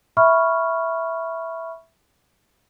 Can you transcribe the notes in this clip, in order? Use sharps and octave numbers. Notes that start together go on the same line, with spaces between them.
E5 B5 C#6 F6